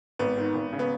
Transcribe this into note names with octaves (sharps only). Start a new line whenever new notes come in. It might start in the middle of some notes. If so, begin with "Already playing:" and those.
G#1 B3
G#2 D#3
G#1
C#3
B3